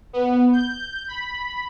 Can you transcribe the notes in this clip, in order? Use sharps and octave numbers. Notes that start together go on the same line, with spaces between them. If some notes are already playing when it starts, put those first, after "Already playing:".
B3
G6
B5